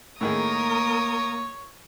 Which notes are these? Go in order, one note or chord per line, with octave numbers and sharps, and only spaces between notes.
A2 D#3 A#3 G#4 A#4 C#5 D#6